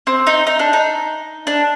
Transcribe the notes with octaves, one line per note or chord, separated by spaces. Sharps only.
C4
D#4
D#4
D4
D#4
D4